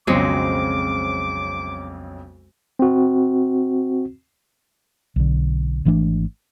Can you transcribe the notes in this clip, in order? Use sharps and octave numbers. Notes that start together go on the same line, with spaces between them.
B1 F2 C#3 F#3 G#3 C4 D6
C4 F#4
B1 D3
G#1 E3 A3 D4